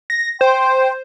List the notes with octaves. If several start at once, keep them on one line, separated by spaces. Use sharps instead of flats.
A#6
C5 G5 C6